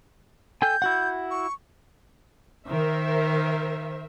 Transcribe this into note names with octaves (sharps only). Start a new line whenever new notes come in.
A4 G5 G#5 G6
E4 F#4 F#5
C#6
D#3 A#4 C5 E5